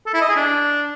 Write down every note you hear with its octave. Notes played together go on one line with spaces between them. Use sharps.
A4
E4
D#5
G#4
D4